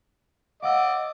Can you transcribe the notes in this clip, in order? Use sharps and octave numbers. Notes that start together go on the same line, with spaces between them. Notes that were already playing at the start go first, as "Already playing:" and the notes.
D#5 F5 F#5 D6 E6